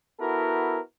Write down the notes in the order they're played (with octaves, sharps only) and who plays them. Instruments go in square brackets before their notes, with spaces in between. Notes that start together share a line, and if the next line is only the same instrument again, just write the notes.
[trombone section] B3 E4 F#4 A4 A#4